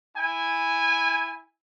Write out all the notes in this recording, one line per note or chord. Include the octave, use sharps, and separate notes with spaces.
E4 G#5